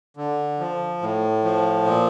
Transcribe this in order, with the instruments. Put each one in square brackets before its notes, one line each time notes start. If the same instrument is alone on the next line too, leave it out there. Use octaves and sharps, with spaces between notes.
[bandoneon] D3
F3
A2
F3
A#2